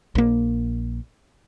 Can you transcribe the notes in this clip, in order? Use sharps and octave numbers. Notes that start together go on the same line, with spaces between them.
A#1 A#3